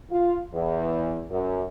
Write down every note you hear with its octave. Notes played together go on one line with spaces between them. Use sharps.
F4
E2
F#2